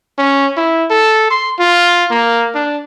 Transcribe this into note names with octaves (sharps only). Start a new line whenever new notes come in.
C#4
E4
A4
C6
F4
A#3
D4